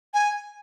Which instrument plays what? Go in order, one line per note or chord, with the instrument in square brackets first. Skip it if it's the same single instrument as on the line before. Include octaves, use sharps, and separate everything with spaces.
[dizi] G#5